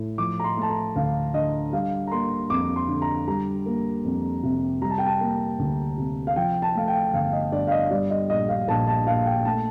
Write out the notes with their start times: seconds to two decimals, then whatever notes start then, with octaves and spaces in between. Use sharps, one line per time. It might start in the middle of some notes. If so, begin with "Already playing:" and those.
Already playing: A2
0.18 F3 D6
0.40 A#5
0.44 C6
0.57 A3 A5
0.70 A#5
0.96 D2 F5
1.34 D3 D#5
1.73 G3 F5
2.07 A#5
2.12 A#3 C6
2.50 F2 D6
2.76 C6
2.88 D3
3.02 A#5
3.27 G3 A#5
3.66 A#3
4.05 F2
4.43 C3
4.82 G3 A#5
4.90 A5
4.98 G5
5.06 A5
5.21 A#3
5.59 D2
5.97 C3
6.27 F5
6.36 F3 G5
6.62 A5
6.75 A3 F5
6.88 G5
7.14 G1 F5
7.33 D#5
7.52 G2 D5
7.67 F5
7.72 D#5
7.91 G3 D5
8.10 D#5
8.29 A#1 D#5
8.48 F5
8.68 A#1 A5
8.87 A5
9.06 A#2 F5
9.26 G5
9.45 A3 A5